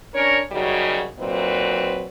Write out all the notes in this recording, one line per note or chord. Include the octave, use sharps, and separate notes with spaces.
C#4 D4 A#4 C#5
F#2 C#3 G3 D#4 F#4
A#2 F#3 C4 D#4 B4